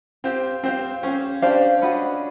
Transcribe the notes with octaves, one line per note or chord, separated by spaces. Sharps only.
C4 G4 C5 F5
C4 G4 C5 F5
C#4 G4 C5 F5
D4 G4 C5 F5
C#4 F#4 B4 D#5